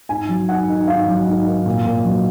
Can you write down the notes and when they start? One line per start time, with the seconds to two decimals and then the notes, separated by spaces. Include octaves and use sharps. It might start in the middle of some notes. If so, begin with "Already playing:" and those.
0.09 G#2 G#5
0.29 F#3
0.48 G#2 F#5
0.68 D#3
0.88 G#2 F5
1.07 F#3
1.27 G#2
1.46 D#3
1.66 A#2
1.85 A#2
2.05 F#3